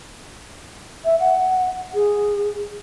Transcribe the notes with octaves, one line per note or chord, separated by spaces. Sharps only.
E5
F#5
G#4